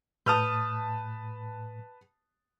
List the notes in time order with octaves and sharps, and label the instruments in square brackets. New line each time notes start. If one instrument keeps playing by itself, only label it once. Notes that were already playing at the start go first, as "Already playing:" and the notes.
[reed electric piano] A2 [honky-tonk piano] B4 A5 [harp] D#6 F6 G6